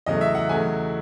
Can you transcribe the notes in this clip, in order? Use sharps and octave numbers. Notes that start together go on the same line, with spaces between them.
E2 C#3 F#3 A3 D#5
E5
F#5
E2 C#3 F#3 A3 G#5